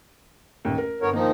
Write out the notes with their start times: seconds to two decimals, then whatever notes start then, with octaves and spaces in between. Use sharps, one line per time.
0.65 A1 D#2
0.78 A#4
1.02 G1 B3 A#4 C#5
1.13 D#3 F3 A#3 D#4